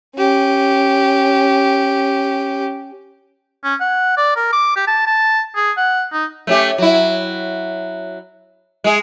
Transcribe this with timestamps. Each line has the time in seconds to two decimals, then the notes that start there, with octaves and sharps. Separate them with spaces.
0.17 C#4 G4
3.64 C#4
3.80 F#5
4.17 D5
4.36 A#4
4.53 D6
4.76 G4
4.87 A5
5.07 A5
5.56 G#4
5.77 F#5
6.12 D#4
6.47 A3 C#4 G4
6.78 F#3 E4
8.84 G#3 G#4